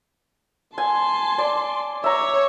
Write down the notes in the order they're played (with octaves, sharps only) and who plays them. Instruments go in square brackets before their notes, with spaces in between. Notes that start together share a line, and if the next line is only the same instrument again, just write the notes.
[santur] G#5 [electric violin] A5 C6
[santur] D5
[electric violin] C#5 [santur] E5 A#5